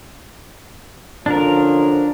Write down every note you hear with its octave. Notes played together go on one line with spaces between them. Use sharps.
D3 F3 C#4 D4 A#4